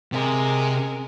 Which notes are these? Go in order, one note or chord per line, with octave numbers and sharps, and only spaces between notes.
C3 G#3 A#4